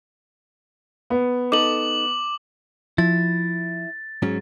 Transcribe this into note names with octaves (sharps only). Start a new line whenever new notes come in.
B3
D#4 A4 D6 F#7
F3 E4 A6
G#2 F#3 C#4